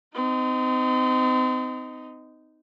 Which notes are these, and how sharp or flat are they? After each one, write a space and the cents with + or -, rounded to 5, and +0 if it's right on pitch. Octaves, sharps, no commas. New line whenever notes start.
C4 -35 D#4 +0